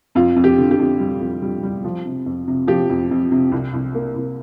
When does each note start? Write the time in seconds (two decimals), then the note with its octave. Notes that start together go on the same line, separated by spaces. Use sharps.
0.15 F2 F4
0.36 F2
0.44 G4
0.58 D3
0.71 G4
0.79 F2
1.00 G3
1.21 F2
1.42 G3
1.63 G3
1.84 F3
2.05 C3
2.26 F2
2.48 C3
2.68 F3 G4
2.89 F2
3.11 F2
3.32 C3
3.52 C2
3.73 C2
3.94 A#3
4.16 C2